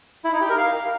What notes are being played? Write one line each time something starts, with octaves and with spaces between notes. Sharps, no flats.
E4
D#4
G4
A#4
F5